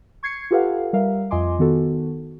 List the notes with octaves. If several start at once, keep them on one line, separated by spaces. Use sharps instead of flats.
C#6 G#6 C7 C#7
F4 G4 A4 B4 F5 F#5
G3 A#4 E5 F5
F2 F4 D#5 G#5 C6 D6
D#3 B3 F#4 A4